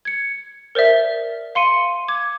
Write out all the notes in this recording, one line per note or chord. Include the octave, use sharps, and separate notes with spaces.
G#6 C#7
A#4 C5 D5 E5
F5 C6 C#7 D#7
D6 G#6